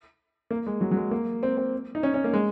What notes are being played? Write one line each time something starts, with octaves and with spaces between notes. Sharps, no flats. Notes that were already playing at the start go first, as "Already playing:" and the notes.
A#3
G#3
F#3
F#3
G#3
A#3
C4
C4
D#4
C#4
C#4
A#3
G#3